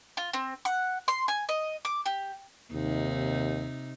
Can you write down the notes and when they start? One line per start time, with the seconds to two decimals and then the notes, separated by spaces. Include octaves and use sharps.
0.17 F4
0.33 C4
0.65 F#5
1.08 C6
1.28 G#5
1.49 D#5
1.85 D6
2.06 G4
2.73 D#2 C3 D#4